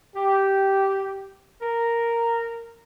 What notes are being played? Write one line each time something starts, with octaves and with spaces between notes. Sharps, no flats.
G4
A#4